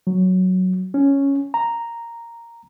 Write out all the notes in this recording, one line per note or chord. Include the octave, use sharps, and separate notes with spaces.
F#3
C#4
A#5